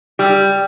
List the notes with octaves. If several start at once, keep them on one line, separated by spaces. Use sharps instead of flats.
G3